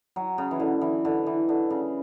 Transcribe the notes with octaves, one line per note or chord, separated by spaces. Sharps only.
F#3
C#3
E3
D3
E3
D3
E3
D3
C#3